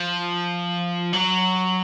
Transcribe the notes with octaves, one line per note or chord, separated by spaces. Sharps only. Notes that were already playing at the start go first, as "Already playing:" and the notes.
Already playing: F3
F#3